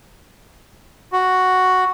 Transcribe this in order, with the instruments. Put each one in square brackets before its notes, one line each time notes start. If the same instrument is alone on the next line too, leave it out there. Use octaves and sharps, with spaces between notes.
[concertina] F#4